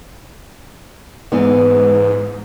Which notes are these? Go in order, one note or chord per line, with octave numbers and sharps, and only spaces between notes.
G#2 E3 B3